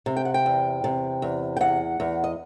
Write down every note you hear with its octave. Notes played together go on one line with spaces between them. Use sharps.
C3
G5
F#5
G5
E2
C3
E2
G5
E2 F#5
E2
D#5